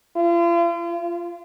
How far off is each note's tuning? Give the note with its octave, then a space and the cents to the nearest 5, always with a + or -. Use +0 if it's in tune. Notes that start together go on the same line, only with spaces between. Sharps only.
F4 -40
F4 -15